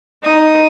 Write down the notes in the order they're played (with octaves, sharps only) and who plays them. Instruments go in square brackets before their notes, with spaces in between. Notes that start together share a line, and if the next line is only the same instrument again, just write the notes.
[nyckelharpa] D#4 [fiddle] D#6